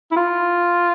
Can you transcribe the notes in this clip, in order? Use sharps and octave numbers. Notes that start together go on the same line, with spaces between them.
E4
F4